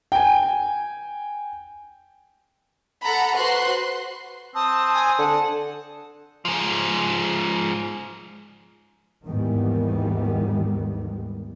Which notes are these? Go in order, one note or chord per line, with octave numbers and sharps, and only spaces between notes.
G5 G#5
A4 F#5 A#5 B5
F#4 B4 C5 C6 F#6 C7
C4 A5 D#6
G#5
D3 F#5 A5
G#2 F3
D#2 G#2 D#3 E3 G3 B3